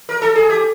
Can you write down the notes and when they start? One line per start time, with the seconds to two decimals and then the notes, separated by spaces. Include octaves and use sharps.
0.09 A#4
0.22 A4
0.35 G#4
0.50 G4